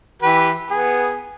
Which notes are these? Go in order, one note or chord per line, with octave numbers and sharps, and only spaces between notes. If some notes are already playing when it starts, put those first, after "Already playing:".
E3 G4 B4
B3 G#4